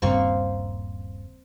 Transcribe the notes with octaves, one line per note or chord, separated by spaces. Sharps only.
D#1 G2 C#3 A#3 C4 C#6